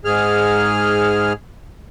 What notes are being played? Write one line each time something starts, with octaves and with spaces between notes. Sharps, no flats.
G#2 G#4 F6